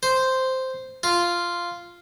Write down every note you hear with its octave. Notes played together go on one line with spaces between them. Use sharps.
C5
F4